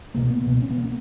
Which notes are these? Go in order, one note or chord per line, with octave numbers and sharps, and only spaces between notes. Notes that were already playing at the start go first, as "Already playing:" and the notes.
C#2 B2 A#3
B3
C#2 B2
C#4
B3
A#3